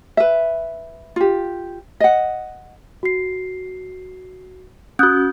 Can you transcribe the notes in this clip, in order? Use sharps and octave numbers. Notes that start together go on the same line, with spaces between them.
B4 E5
F4 G4
D#5 F#5
F#4 C7
C#4 F#4 D#6 F#6 G6